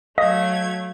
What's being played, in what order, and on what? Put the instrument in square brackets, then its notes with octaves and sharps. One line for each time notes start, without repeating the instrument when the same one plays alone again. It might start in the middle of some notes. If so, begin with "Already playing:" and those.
[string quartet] F#3 A3 G#6 [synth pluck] D#5 [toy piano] F5